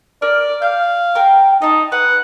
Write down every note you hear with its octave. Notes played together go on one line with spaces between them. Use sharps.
A#4 D5
F5 G6
A#4 G5
D#4 D#5 A5
B4 F#5